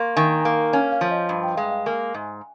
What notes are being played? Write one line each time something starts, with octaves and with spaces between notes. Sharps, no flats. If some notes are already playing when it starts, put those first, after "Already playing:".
Already playing: A#3 C6 C#6
D#3 G#5
A#5
A#3 G#5
C#4 F5
F5
F3
D#5
G2
G5
G#3 F5
F5
A#3 G#5
G#2